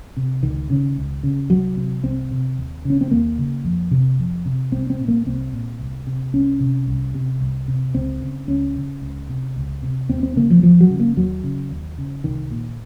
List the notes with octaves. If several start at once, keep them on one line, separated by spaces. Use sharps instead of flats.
C3
C#2 D#3
C#3
C#2
C#3
C2 F#3
C3
C2 C4
C3
D#2
C#3 C#4
C4
D#2 A#3
C#3
F2
C3
F2
C3
C2 C4
C4
A#2
A#3
C2 C4
A#2
C2
C3
C2 C#4
C3
C2
C3
C2
C3
C#2 C4
C#3
C#2 C#4
C#3
C#2
C3
C#2
C3
D#2 C4
C4
C#3 A#3
F3
D#2 F3
F#3
C#3
A#3
D#2 F#3
C#3
D#2
C#3
C2 D#3
A#2